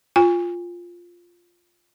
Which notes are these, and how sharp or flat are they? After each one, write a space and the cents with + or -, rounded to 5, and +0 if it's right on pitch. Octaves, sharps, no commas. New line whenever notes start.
F4 +0 G#5 -30